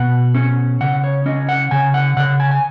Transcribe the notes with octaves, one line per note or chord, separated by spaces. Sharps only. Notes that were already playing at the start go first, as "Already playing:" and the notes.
Already playing: B2 F#5
C#4
C#3 F#5
C#5
C#4 D#5
F#5
C#3 G#5
F#5
C#3 F#5
G#5
G#5